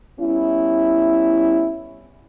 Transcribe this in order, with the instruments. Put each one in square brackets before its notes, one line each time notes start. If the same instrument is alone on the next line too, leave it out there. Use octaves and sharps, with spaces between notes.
[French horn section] G3 B3 C#4 E4